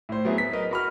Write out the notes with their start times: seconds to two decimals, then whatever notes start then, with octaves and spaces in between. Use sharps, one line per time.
0.09 A2 C5
0.25 F#3 B3 E4 G#4
0.38 B6
0.53 A#4 B4 D#5
0.71 F#4 B5 F6